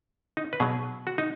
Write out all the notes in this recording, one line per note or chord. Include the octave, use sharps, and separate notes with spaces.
D#4
B4
B2 F#3 G#4
F#4
D#4